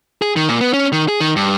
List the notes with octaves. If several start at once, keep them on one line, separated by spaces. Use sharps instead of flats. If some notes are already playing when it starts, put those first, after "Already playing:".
G#4
D#3
A#2
B3
C#4
D#3
G#4
D#3
G2